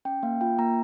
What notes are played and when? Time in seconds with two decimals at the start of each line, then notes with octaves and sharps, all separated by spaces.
0.05 C#4 G5
0.23 A#3 F5
0.41 F4 G5
0.59 A#3 A#5